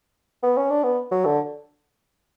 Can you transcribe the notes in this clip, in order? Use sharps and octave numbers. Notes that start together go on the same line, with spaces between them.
B3
C#4
D4
B3
F#3
D3